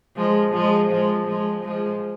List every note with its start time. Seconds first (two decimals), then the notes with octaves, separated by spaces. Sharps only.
0.16 F3 G#3
0.53 F3 G#3
0.90 F3 G#3
1.27 F3 G#3
1.64 F3 G#3